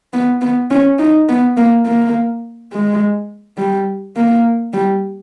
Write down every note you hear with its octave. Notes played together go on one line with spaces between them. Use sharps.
B3
B3
C#4
D#4
B3
A#3
A#3
G#3
G3
A#3
G3